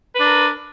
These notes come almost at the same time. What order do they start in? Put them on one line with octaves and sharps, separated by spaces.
B4 D4 A#4